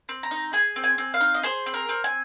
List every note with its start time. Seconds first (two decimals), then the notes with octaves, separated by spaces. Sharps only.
0.09 C4
0.23 A#5
0.31 D#4
0.53 G#4 G#5
0.76 C4
0.84 G#5
0.98 C4
1.14 F5
1.20 D#4
1.34 D#5
1.43 G#4 C5
1.66 C4
1.74 A#4
1.89 C4
2.04 G#5